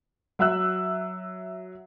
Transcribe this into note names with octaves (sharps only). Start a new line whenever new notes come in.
F#3 E5 E6 F#6